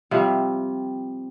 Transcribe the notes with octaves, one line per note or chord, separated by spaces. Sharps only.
C3 F3 G3